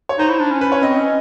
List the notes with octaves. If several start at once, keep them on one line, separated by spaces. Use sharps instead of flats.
C#5
D#4 C5
E4
D4
C#4
B4
C#5
C4 D#5
C#4